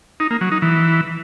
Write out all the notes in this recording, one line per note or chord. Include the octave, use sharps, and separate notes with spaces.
D#4
A#3
F#3
D#4
E3